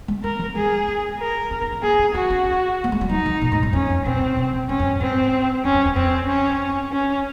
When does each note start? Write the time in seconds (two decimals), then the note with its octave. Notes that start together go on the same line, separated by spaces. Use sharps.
0.08 G#3
0.23 C#4 A#4
0.39 F3
0.55 G#3 G#4
0.88 C#4
1.19 A#4
1.51 C#4
1.62 D#4
1.73 C#4
1.83 A#3 G#4
1.99 C#4
2.14 C#4 F#4
2.30 C#4
2.84 A#3
2.92 G#3
3.01 F#3
3.09 F3 D#4
3.26 D#3
3.41 A#2
3.52 G#2
3.63 F#2
3.73 F2 C#4
3.90 F#2
4.05 A#2 C4
4.21 C#3
4.37 C3
4.52 A#2
4.69 G#2 C#4
4.80 F#2
4.90 F#2
5.01 G#2 C4
5.64 F2 C#4
5.74 F#2
5.85 F2
5.96 F2 C4
6.28 C#4
6.92 C#4